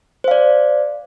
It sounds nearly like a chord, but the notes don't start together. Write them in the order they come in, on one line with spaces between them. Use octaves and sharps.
C5 F5 D5